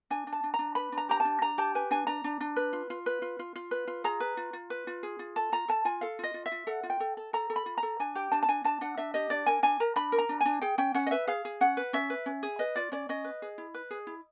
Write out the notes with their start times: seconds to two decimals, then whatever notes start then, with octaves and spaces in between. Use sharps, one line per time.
0.11 D4 G#5
0.27 D4
0.33 A5
0.43 D4
0.54 A#5
0.59 D4
0.75 B4 B5
0.92 D4
0.98 A#5
1.09 G4 A#5
1.20 A5
1.25 D4
1.42 D4 A#5
1.58 G4 A5
1.75 B4 G#5
1.91 D4 G#5
2.07 D4 A#5
2.24 D4
2.41 D4
2.56 B4
2.73 F4
2.90 F4
3.06 B4
3.22 F4
3.39 F4
3.56 F4
3.71 B4
3.88 F4
4.04 G#4 A#5
4.20 B4
4.37 F4
4.53 F4
4.70 B4
4.87 F4
5.03 G#4
5.19 F4
5.36 A4 A5
5.52 F4 A#5
5.68 A4 A5
5.85 F4 G#5
6.01 A4 F5
6.19 F4 D#5
6.34 F4
6.46 E5
6.52 F4
6.67 A4 F#5
6.83 F4
6.90 G5
7.00 A4
7.17 A4
7.33 A4 A#5
7.50 A4
7.56 B5
7.66 F4
7.78 A#5
7.83 A4
8.00 D4 G#5
8.15 G4 G5
8.32 D4 A5
8.43 A5
8.48 D4 G#5
8.64 D4 A5
8.81 D4 F#5
8.97 D4 E5
9.14 G4 D#5
9.30 D4 D5
9.46 A#4 G#5
9.63 D4 G#5
9.80 A#4 A#5
9.96 D4 B5
10.12 A#4
10.18 A#5
10.29 D4
10.41 D4 G#5
10.62 G#4 G5
10.78 C#4 G5
10.95 C#4 F#5
11.07 D#5
11.11 B4 E5
11.27 G#4 F5
11.45 G#4
11.61 C#4 F#5
11.77 B4
11.93 C#4 E5
12.10 B4
12.26 C#4
12.43 G#4
12.59 B4 D#5
12.76 F4 D5
12.92 C#4 D5
13.09 C#4 D#5
13.25 B4
13.42 G#4
13.58 E4
13.74 B4
13.91 G#4
14.07 E4